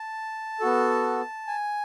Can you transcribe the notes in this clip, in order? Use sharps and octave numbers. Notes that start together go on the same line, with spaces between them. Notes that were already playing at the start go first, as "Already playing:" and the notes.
Already playing: A5
B3 F#4 A4
G#5